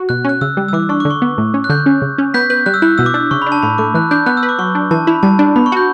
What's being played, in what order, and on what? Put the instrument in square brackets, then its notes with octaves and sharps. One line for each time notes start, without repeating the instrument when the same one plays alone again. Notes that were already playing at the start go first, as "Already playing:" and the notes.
Already playing: [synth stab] F#4
[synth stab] B2 [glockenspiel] F#6
[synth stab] C#4 [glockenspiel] F#6
[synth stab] C#3 [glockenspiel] E6
[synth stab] G3
[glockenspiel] E6
[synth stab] E3 [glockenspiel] D6
[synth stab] D4 [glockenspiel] C#6
[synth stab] D3 [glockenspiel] D6
[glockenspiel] C#6
[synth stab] B3
A2
C#4
[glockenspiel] F#6
[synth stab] D3 [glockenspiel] G6
[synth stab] C#4
C#3
C#4
[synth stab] B3 [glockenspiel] G6 B6
[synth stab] B4 [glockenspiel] G6
[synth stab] G3 [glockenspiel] F#6
[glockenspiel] E6
[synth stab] E4 [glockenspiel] F#6
[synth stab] B2 [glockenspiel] E6
[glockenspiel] D6
[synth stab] D4 [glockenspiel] E6
[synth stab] C#3 [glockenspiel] C#6
[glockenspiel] B5
[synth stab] D4
[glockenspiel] A5
[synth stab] A2 [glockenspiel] B5
[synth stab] A3 [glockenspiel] D6
[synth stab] E3 [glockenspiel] F#6
[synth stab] D4 [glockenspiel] G6
[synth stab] B3 [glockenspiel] F#6
[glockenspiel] E6
[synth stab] B4
[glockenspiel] D6
[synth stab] F#3 [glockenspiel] C#6
[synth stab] D4
[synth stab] E3 [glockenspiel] A5
[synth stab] E4 [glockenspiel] B5
[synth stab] G3 [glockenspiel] A5
[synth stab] D4
[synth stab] B3 [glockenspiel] B5
[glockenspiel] C#6
[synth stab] F#4 [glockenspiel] G6